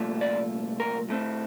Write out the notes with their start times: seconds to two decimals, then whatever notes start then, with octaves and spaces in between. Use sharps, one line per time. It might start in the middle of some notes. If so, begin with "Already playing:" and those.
Already playing: C2 A#2 F3 A3
0.21 D5
0.80 A#4
1.09 A2 A3 C4